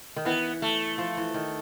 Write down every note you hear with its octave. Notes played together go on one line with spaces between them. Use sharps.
D#3
E3 B3
A3
F3
E3
D#3